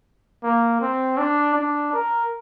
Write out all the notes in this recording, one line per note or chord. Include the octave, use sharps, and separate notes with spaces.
A#3
C4
D4
D4
A#4